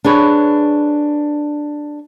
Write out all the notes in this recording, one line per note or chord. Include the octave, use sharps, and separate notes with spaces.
D4 G#4 B4 C#5